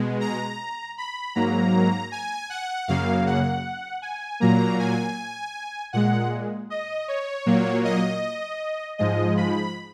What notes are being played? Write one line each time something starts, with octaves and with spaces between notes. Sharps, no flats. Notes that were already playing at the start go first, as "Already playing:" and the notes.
Already playing: B2 G#3
A#5
B5
G#2 F#3 A#3 A#5
G#5
F#5
F#2 C#3 F#3 A#3 F5
F#5
G#5
A#2 F#3 A#3 A#5
G#5
A#2 G#3 F#5
D#5
C#5
A#2 F#3 A#3
D#5
G#2 F3 G#3 D#5
B5